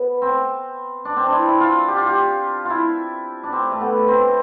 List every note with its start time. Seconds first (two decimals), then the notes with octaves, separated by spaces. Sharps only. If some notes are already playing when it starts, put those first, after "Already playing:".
Already playing: B3
0.22 C4
1.05 D4
1.17 C4
1.25 D4
1.32 E4
1.48 E4
1.61 F4
1.88 G4
1.97 F4
2.06 G4
2.65 E4 F4
3.43 D4
3.52 C4
3.71 A3
3.81 B3
4.08 C4